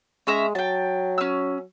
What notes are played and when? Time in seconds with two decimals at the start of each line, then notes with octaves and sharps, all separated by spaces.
0.27 G#3 C#4 E5 A#5
0.55 F#3 G5 A5
1.18 C#4 E6